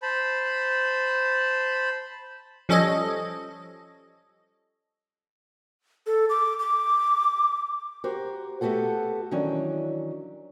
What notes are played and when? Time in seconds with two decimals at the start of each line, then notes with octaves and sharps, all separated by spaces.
0.02 C5 A5 B5
2.69 F3 G3 C#4 A4 C#5 D#5
6.07 A4
6.29 D6
6.59 D6
8.04 F#4 G4 A#4 C5
8.61 A3 B3 F#4 G4 A4 F#5
9.31 D#3 E3 F#3 C#4 D4